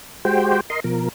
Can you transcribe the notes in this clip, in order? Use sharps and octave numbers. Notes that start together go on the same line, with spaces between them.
G#3 F#4 G4 C5 G5
A#4 D#5 C6
B2 F3 A#4